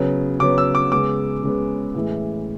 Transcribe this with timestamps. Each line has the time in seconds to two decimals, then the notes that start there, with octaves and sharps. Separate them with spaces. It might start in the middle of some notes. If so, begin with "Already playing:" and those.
Already playing: C#3 F#3 B3
0.39 C#3 F#3 B3 D6
0.58 E6
0.75 D6
0.92 C#3 G#3 B3 D6
1.43 C#3 G#3 B3
1.95 A2 E3 G#3